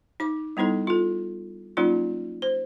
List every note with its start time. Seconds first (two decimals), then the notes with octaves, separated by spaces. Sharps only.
0.20 D#4 D6
0.57 G3 B3 D#4 E4 A4
0.87 F4 A4
1.77 F#3 A#3 C#4 D#4 F4
2.42 C5